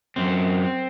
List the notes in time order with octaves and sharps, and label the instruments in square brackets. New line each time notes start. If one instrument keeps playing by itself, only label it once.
[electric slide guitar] F#2 C4